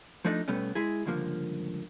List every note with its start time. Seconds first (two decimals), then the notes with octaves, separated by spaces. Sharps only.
0.25 F3 A3 D4 D#4
0.48 B2 G3 A3 B3 C#4
0.75 G#3 E4 G#4
1.06 C#2 G2 D3 F3 A#3